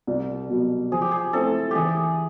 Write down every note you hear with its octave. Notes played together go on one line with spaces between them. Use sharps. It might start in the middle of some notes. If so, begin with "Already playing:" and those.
C2
B2 F#3
F3 G#4
G4
G#4
A3 C4 E4 A4
E3 G4 G#4